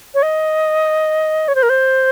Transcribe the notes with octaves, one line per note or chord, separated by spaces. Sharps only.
C#5
D#5
C#5
C5
A#4
C5